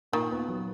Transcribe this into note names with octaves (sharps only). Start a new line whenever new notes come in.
A#2 D#3
B3
F#3